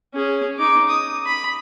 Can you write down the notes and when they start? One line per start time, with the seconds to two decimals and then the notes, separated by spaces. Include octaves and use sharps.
0.14 C#4 G#4
0.59 D#4 D6
0.88 D#6
1.26 B5